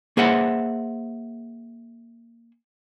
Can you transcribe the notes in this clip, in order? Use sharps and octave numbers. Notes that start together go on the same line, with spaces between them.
A#3 G#4 C5 E5 F#5